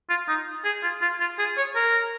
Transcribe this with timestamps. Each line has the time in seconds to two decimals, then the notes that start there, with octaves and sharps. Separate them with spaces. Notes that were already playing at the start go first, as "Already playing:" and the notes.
0.09 F4
0.28 D#4
0.65 G#4
0.83 F4
1.01 F4
1.20 F4
1.39 G#4
1.57 C#5
1.75 A#4